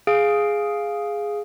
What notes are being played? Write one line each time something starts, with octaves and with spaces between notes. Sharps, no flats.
G#4 F5 D7